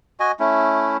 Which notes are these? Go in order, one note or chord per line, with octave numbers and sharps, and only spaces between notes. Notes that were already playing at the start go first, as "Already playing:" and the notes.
F#4 D#5 G#5
A3 C#4 E4